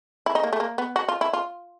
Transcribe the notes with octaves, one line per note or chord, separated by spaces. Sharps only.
E4
D#4
A#3
A3
A#3
B3
F#4
F4
E4
F4